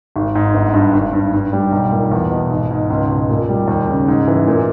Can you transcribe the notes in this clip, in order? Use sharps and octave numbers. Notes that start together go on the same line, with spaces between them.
G#1
G#2
G1
G2
G#1
G2
G2
G3
B1
A#2
E2
B2
G#1
G#2
C#2
B2
A#2
G3
D#2
C#3
G#2
E3
A#2